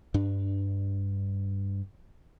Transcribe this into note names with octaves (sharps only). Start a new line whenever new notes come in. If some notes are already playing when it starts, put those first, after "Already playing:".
G2 D4